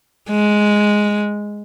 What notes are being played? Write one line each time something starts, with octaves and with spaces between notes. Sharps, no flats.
G#3